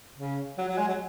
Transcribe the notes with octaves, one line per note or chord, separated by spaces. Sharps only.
C#3
F#3
F#3
G#3
F#3